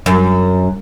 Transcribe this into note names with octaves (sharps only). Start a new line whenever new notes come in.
F#2